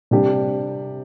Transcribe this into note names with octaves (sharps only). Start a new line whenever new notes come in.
C3 G3 D4 G4